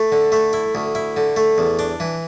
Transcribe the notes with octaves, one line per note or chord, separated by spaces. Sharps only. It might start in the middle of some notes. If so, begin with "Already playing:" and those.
Already playing: A3
D3
A3
E4
D2
E4
D3
A3
E2
D4
E3